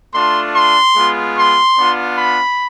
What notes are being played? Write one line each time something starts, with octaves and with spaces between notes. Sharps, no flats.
A3 D4 F4 C6
C6
G#3 B3 F4
C6
B3 D4 F4
B5